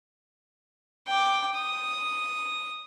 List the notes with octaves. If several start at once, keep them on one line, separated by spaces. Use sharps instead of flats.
G5 D6
D#6